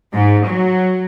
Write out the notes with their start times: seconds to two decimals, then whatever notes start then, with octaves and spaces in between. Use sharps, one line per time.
0.14 G#2
0.47 F#3